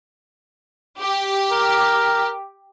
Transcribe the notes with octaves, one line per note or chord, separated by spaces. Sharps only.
G4
A#4